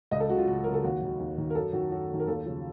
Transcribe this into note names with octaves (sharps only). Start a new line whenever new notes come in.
C#2 D#5
A4
C#3 F#3 F#4
F4
C#2 F#4
C#3 F#3 A#4
A4
D#2 F#4
D#3 F#3
D#2
D#3 F#3
A#4
F#2 A4
D#3 F#3 F#4
F#2 F#4
D#3 F#3
A#4
D#2 A4
C#3 F3